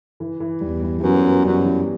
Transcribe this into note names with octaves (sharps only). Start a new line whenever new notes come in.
E3
E3
E2 G3
G3
E2
F#2 B3
B3
F#2 G3
E3